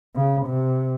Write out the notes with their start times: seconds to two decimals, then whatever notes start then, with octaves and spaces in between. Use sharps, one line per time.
0.15 C#3
0.46 C3